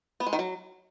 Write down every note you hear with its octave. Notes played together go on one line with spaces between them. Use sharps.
B3
G#3
D#3
F#3